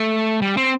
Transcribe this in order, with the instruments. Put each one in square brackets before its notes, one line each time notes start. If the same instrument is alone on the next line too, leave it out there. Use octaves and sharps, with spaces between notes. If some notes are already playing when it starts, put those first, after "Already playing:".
Already playing: [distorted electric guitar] A3
G3
C4